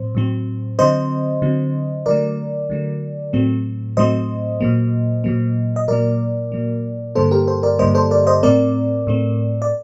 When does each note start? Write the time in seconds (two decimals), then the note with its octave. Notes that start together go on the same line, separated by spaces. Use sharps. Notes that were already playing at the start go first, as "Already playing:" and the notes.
Already playing: A2 F#3 C4 C5
0.15 A2 F#3 C4
0.79 D3 F#3 C4 C5 D#5
1.42 D3 F#3 C4
2.06 D3 F#3 A3 A#4 D5
2.70 D3 F#3 A3
3.33 A2 F#3 A3 C4
3.97 A2 F#3 A3 C4 C5 D#5
4.61 A#2 F#3 A#3
5.24 A#2 F#3 A#3
5.76 D#5
5.88 A#2 F#3 A#3 A#4 D5
6.52 A#2 F#3 A#3
7.15 G2 D3 G3 A#3 A4 C5
7.31 G4 A#4
7.47 A4 C5
7.63 A#4 D5
7.79 G2 D3 G3 A#3 C5 D#5
7.95 A4 C5
8.11 A#4 D5
8.27 C5 D#5
8.43 A2 A3 C4 A#4 D5
9.07 A2 A3 C4
9.62 D5